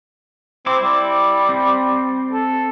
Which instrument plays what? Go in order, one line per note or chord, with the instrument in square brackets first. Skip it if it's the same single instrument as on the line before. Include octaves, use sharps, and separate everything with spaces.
[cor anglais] C4 [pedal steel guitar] E4 D6
[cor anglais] G3
[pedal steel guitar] C4
[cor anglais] A4